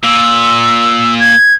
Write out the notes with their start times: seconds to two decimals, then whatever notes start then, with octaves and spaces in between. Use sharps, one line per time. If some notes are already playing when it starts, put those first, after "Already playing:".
0.03 A#2 E6
1.19 G#6